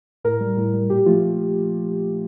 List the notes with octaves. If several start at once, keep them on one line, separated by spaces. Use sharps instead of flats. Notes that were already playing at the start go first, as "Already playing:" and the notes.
A2 A#4
G3
A2
G3
A#2 G4
F3 A3 F4